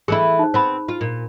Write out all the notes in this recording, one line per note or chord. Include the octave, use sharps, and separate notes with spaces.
E3 A3 E4 G#4
D#4 C5
B3 C4 C5 B5
F4
A#2